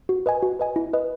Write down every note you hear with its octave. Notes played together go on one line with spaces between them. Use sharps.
F#4
B4 D#5 G#5
F#4
B4 D#5 G#5
E4
B4 D#5